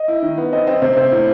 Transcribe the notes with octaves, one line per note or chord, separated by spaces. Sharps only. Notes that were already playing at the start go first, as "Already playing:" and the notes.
Already playing: D#5
E4
D#3
B3
C4 D#5
C4 D#5
C3 C5
C3 C5
A2